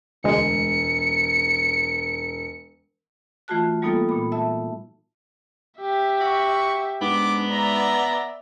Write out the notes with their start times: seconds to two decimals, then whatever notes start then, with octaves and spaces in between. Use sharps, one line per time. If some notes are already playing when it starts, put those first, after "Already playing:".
0.24 E1 D2 G#3 C#7
3.48 E3 A3 F4 F#4 A5 F#6
3.82 G3 A#3 B3 D#4 F4 A4
4.09 A#2 B5
4.32 E5 A5 E6
5.80 G4 E5
6.21 F#4 C#6
7.02 G#2 B3 D4 D6
7.52 D5 E5 A#5